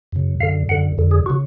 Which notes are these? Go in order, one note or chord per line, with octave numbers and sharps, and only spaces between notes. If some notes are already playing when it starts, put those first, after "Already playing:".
F#2 C#3
F#2 D3 F5
F#2 D3 F#5
F2 D3
G#4
F#4
C#3